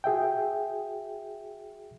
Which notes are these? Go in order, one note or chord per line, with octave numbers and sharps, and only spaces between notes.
F#4 G#4 E5 G5